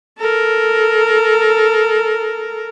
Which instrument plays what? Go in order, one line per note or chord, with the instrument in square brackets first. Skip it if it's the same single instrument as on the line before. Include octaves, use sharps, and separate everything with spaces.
[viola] A4 A#4